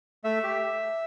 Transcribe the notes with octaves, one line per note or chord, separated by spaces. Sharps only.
A3 E5
G4